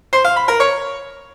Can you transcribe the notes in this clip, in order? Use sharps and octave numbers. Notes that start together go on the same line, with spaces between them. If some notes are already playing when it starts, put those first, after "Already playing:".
C5
F5
B5
A#4
C#5